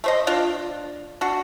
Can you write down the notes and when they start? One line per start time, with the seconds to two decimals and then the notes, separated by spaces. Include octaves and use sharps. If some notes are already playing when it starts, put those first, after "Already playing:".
0.04 A3 C5 D#5
0.27 D4 F4
1.21 D4 F#4